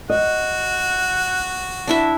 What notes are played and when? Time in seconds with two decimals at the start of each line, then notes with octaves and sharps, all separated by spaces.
0.10 F#4 D#5 F#5
1.87 D4 E4 E5